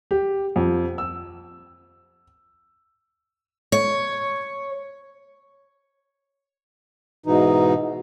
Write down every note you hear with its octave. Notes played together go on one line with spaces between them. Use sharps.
G4
F2
E6
C#5
G#2 B2 E3 D#4